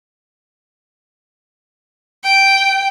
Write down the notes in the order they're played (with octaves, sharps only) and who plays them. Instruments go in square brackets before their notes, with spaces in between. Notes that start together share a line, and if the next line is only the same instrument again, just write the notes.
[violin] G5